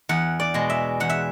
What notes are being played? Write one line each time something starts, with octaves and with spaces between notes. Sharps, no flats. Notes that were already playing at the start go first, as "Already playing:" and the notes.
E2 F#5
D5
B2 G#3
E5
E2 F#5
E5